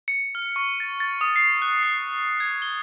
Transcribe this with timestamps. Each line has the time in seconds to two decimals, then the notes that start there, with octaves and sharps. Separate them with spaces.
0.08 C#7
0.35 F6
0.56 C#6
0.80 A6
1.00 A6
1.21 D#6
1.36 C7
1.62 F#6
1.83 C7
2.40 G#6
2.62 G7